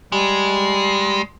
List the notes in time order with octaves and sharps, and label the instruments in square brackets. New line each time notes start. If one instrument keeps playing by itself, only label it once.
[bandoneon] G3 [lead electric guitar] G#3